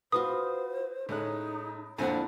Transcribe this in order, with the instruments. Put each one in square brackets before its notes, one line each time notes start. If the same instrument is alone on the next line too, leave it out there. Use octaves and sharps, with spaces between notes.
[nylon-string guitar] F4 F#4 B4 [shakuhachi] C5 [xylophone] D#6
[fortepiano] A2 C#4 F#6 [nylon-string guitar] G#3 [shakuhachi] D#4
[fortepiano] F2 A#2 F#5 [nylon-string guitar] D4 E4 G#5 [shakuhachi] C5